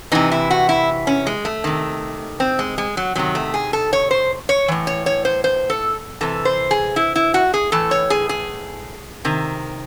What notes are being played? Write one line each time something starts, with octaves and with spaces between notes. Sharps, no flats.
C3 E3 D#4
E4
F#4
E4
C#4
G#3
A3
C3 D#3
C4
G#3
G#3
F#3
C3 D#3 F#3
A3
G#4
A4
C#5
C5
C#5
A2 E3
C#5
C#5
C5
C5
A4
C3 E3 A4
C5
G#4
E4
E4
F#4
G#4
A2 E3 A4
C#5
G#4
G#4
C3 D#3